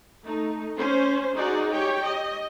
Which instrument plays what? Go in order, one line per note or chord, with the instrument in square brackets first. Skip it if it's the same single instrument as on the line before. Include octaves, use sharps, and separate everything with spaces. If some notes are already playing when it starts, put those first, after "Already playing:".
[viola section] A3 D#4
C#4 C5
D#4 F#4 G#4 D5
G4 C#5 G5
D#5